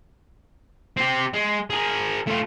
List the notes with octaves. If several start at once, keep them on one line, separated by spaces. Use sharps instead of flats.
C4 G4
G#3
G#4 A#4
A3 F4